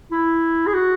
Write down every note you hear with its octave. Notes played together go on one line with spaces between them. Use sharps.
E4
G#4
F#4